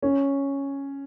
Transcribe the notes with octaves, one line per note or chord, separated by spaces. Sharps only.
C#4